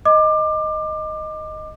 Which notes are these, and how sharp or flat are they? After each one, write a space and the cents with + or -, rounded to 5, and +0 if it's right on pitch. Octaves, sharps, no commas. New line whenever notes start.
D#5 +0 D6 +25